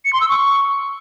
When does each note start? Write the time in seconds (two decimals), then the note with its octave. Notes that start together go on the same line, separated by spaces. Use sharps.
0.05 C#7
0.13 C6
0.21 E6
0.29 C#6